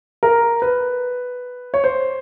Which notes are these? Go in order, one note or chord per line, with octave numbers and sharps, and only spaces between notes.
A#4
B4
C#5
C5